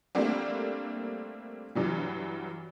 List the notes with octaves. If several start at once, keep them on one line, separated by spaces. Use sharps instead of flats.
G3 A3 A#3 C4 D4
G2 E3 F#3 G3